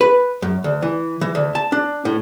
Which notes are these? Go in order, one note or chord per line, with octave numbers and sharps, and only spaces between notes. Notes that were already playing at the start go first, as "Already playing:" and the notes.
B4
F#2
D2
E3
E3
D2
A5
D4
A2